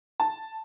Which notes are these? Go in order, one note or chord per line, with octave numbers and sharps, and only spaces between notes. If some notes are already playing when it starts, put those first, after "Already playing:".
A5